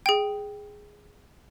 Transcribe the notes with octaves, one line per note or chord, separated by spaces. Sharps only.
G#4 G5